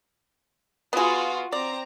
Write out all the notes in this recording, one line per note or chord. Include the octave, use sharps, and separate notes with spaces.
B3 F4 F#4 G#4
C4 D5 A#5